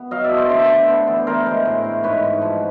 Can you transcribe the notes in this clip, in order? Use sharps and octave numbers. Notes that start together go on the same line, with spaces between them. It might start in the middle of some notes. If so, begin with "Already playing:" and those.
Already playing: B3
F#3 D#5 F5
D5 E5
A3
C5 D5
D3 C5 D5
D3
B3
E3
E3 A#4 C5
G#3
A2
A2
G#2 B4 C#5
G#2
F3